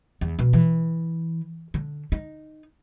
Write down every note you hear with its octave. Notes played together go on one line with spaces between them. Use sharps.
E2
B2
E3
D3
D#4